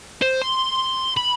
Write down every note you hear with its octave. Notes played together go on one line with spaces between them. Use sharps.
C5
C6
B5